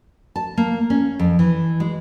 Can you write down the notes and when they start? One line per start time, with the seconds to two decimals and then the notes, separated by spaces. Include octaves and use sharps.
0.36 A5
0.57 A#3
0.90 C#4
1.19 F2
1.39 E3
1.80 G#3